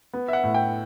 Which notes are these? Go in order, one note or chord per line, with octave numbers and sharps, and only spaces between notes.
B3
E5
F#5
A2
G5